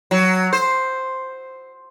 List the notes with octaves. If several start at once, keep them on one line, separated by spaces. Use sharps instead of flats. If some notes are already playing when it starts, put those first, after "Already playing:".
F#3
C5